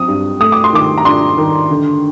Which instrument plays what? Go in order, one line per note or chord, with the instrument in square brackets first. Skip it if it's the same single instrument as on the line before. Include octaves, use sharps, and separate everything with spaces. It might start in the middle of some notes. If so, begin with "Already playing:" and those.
Already playing: [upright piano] F#3 C4 D#6
G2
A3 D#6
D6
C6
D#3 D6
A#5
D4 C6
D#3
D3